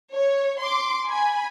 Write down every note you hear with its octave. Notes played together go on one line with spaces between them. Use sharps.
C#5
C6 D6
G#5 B5